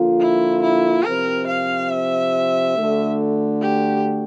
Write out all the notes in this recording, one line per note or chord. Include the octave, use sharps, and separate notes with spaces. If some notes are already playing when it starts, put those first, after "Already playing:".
Already playing: D3 F3 A#3 F4
E4
E4
C3 F3 C4 A#4
F5
E5
D2 D3 A3
G4